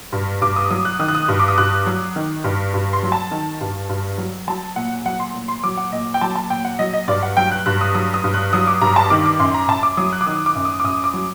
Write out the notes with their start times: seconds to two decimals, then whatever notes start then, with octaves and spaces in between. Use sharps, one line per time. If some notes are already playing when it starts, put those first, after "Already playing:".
0.12 G2
0.41 G2 D6
0.56 D#6
0.70 F#3 D#6
0.85 F#6
0.99 D#3 D#6
1.08 F#6
1.15 D#6
1.28 G2
1.40 D6
1.48 D#6
1.58 G2 F#6
1.86 F#3
2.16 D#3
2.44 G2
2.74 G2
2.93 C6
3.03 F#3
3.12 A5
3.31 D#3
3.61 G2
3.89 G2
4.18 F#3
4.47 F#3 A5
4.76 A#2 F#5
5.05 F#3 F#5
5.20 C6
5.35 A#2
5.48 C6
5.64 F#3 D6
5.77 F#5
5.92 A#2 D#5
6.14 G5
6.21 F#3 A5
6.35 A5
6.50 A#2 G5
6.65 F#5
6.79 F#3 D#5
6.93 D#5
7.08 G2 D5
7.23 F#5
7.37 F#3 G5
7.52 F#6
7.66 G2 F#6
7.81 D#6
7.95 F#3 D#6
8.14 D#6
8.24 G2
8.34 F#6
8.53 F#3 D#6
8.67 D6
8.82 G2 A#5
8.96 A5
9.10 D#3 D6
9.25 D6
9.40 F#2 C6
9.54 A#5
9.68 F#2 A5
9.83 D6
9.97 F#3 D#6
10.13 F#6
10.21 D6
10.27 D#3 D#6
10.46 D6
10.55 F#2
10.65 D#6
10.80 D6
10.84 F#2 D#6
11.04 D6
11.14 F#3